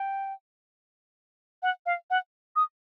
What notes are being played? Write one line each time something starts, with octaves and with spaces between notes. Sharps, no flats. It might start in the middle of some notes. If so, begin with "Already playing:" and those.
Already playing: G5
F#5
F5
F#5
D#6